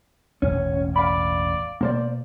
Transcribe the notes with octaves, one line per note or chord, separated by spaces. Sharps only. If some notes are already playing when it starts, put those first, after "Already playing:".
E1 A1 C#4
D5 F5 B5
B2 A#3 C5 D5